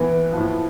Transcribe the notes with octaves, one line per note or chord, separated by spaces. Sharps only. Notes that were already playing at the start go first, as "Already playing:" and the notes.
Already playing: A2 E3 B3
F3
A2